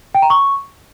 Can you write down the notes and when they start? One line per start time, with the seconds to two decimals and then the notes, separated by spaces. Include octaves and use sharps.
0.15 G5
0.22 A#5
0.30 C#6